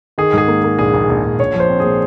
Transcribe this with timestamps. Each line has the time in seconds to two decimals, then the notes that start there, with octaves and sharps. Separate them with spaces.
0.18 D#3 G#4
0.33 G#2 G#4
0.48 A#3
0.64 A#3
0.79 A#1 G#4
0.94 A#1
1.10 A#1
1.24 A#1
1.39 A#1 C#5
1.54 F3
1.60 C5
1.70 C4
1.80 G#4
1.85 A#2